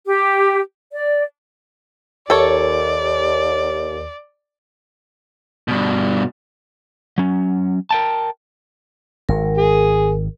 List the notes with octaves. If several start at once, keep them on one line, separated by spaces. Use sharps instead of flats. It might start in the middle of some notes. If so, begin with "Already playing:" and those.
G4
D5
D#2 A4 C#5 D5
G2 B2
F#3 C#4
A#4 G5 A5
G#1 A#4
G#4